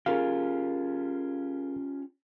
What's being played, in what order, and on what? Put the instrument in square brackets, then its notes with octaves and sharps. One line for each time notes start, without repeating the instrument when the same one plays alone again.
[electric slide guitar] C#4 F4 G4 [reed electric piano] G#4 A#4 F5